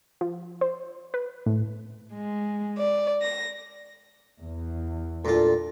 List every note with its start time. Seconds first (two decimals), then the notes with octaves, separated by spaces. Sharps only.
0.21 F3
0.61 C5
1.14 B4
1.46 A2
2.13 G#3
2.77 D5
3.21 A#6
4.42 E2
5.25 D2 A#2 D3 F4 A4